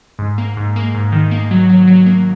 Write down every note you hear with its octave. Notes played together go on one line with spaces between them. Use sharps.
G#2
A#3
G#2
A#3
G#2
D#3
A#3
F#3
F#3
F#3
A#3